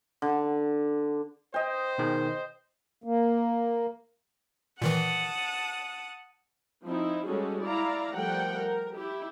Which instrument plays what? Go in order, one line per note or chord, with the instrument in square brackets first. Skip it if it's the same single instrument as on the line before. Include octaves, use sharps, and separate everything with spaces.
[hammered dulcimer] D3
[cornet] C5 [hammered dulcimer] D#5 G5
[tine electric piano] B2 D#3 G#4
[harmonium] A#3
[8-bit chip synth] A#2 D#3 E3 [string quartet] F#5 A5 D#6
[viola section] F3 C4 D#4 E4
G3 G#3 C#4 F#4 G#4 A4
E4 D5 F5 A#5
F3 G3 A3 A#4 F#5 G5
A#4
E4 G4